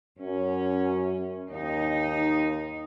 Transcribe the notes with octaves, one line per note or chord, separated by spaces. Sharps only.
F#2 C#4
D#2 D#4